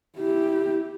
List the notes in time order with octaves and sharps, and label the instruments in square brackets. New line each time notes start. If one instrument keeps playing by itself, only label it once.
[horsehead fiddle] E4 G4